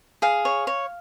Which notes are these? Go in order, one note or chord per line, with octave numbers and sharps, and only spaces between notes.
G#4 F5
C#5
C#5